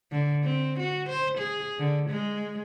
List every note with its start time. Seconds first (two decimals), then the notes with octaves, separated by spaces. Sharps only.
0.12 D3
0.43 C4
0.80 F#4
1.09 C5
1.38 G#4
1.79 D3
2.09 G#3